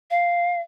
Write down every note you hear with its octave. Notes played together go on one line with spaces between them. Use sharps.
F5